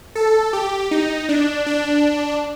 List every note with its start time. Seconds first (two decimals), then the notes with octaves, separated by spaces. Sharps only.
0.15 A4
0.53 G4
0.91 D#4
1.29 D4
1.66 D4